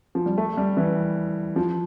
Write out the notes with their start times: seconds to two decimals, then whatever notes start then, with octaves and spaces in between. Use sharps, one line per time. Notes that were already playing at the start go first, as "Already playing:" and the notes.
0.15 F3
0.26 G3
0.38 A3
0.57 G3
0.77 E3
1.56 F3